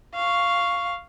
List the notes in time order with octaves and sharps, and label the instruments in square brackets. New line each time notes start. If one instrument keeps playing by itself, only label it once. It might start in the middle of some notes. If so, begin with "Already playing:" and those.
[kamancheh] F5 C#6